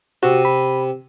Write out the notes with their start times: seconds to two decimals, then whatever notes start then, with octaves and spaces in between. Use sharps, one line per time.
0.23 C3 F#4
0.45 B5